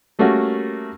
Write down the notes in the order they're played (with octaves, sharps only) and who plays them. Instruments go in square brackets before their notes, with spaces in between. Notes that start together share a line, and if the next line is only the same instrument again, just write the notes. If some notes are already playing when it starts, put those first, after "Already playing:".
[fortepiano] G3 A3 A#3 C#4 F#4 A#4